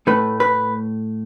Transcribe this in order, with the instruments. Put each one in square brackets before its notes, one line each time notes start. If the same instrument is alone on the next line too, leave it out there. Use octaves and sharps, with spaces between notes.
[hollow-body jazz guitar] A2 A3 B4
B4